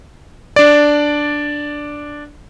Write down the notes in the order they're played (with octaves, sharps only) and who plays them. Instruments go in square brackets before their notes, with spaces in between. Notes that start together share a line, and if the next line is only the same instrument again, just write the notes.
[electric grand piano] D4 D5